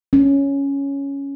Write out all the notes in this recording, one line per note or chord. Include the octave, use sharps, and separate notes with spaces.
C#4